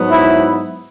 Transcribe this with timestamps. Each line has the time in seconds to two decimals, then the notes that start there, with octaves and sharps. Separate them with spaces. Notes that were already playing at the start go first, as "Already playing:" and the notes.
Already playing: G#2 F#3 B3
0.11 E4